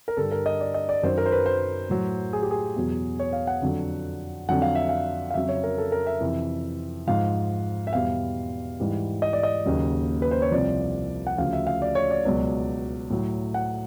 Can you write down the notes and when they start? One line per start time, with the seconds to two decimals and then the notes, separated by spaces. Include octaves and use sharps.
0.08 A#4
0.17 G2 D3 G3 A4
0.32 A#4
0.46 D#5
0.61 D5
0.74 D#5
0.89 D5
1.03 F#2 D#3 F#3 C5
1.18 A#4
1.26 C5
1.32 B4
1.46 C5
1.90 A2 F#3
2.33 G#4
2.42 G4
2.51 G#4
2.76 E2 B2 F#3
3.20 C#5
3.33 F5
3.47 F#5
3.62 F2 D3 F#3
4.48 F2 D3 F#3 F#5
4.62 F5
4.75 E5
4.89 F5
5.31 F5
5.34 F2 C#3 F#3 E5
5.49 C#5
5.64 A#4
5.78 A4
5.92 A#4
6.07 E5
6.21 F2 C3 E3
7.07 G#2 F3 F5
7.87 E5
7.93 E2 B2 G3 F5
8.80 G#2 E3 G3
9.22 D#5
9.33 D5
9.43 D#5
9.66 D#2 C#3 F#3
10.22 B4
10.31 C5
10.42 C#5
10.51 C2 C3 F3 D5
11.27 F#5
11.38 D2 C#3 F3 F5
11.53 E5
11.67 F5
11.82 D5
11.95 C#5
12.11 D5
12.25 C#2 B2 F#3
13.10 A2 F#3
13.54 F#5